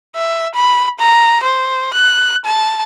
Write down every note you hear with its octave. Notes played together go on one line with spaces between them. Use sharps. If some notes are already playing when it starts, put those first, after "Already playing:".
E5
B5
A#5
C5
F#6
A5